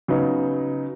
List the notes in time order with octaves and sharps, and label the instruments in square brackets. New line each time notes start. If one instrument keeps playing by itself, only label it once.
[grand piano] C#3 F#3 B3 D#4